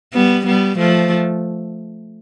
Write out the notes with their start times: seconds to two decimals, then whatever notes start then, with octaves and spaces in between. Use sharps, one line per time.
0.14 G3 B3
0.46 G3 B3
0.78 F3 A3